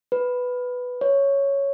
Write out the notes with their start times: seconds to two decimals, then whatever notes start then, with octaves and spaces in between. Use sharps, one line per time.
0.12 B4
1.01 C#5